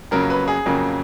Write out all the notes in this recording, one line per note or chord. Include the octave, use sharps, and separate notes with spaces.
F2 C#3 F#3 A#3 A#4
B4
G#4
F2 C#3 F#3 A#3